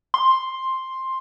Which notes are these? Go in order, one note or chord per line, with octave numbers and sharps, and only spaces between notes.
C6